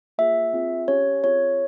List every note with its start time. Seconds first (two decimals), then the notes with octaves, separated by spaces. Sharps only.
0.18 A#3 F4 G#4 E5
0.53 C4 F4 G#4
0.88 C#4 G4 C#5
1.24 C4 F4 G#4 C#5